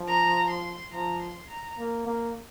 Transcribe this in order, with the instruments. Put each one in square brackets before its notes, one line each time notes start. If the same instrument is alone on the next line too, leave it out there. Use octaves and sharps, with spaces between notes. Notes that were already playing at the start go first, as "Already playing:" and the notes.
Already playing: [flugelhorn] F3
[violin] A#5
C6
[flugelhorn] F3 [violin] A#5
[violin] C6
A#5
[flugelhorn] A#3
A#3